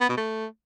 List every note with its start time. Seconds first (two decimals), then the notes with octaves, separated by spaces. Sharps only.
0.01 B3
0.09 B2
0.17 A3